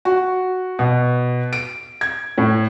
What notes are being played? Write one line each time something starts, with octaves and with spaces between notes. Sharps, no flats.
F#4
B2
D7
G#6
A2